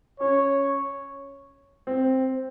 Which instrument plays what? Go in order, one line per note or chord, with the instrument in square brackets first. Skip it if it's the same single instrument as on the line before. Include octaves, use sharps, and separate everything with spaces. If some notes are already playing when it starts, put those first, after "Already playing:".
[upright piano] C#4 [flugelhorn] C#5
[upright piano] C4